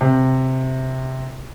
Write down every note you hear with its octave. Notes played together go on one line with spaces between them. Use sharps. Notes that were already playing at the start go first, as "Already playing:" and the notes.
C3